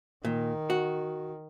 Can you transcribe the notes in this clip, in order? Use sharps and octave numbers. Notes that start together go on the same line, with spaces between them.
A#2 D#3
F#4